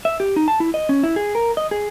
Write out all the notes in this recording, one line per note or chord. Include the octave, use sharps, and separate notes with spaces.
E5
G4
D#4
A5
E4
D#5
C#4
E4
G#4
A#4
D#5
G#4